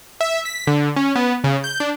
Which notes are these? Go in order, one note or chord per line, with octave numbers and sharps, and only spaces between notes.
E5
B6
D3
C#4
B3
C#3
G6
D4